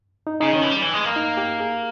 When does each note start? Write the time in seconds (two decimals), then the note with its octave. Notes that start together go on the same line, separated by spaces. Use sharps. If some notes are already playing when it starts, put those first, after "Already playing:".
0.27 D#4
0.40 C#3 D#4
0.51 D#3 C#4
0.62 E3
0.70 G3
0.82 E3
0.93 G#3
1.05 A#3
1.16 D#4
1.37 G4
1.60 G#4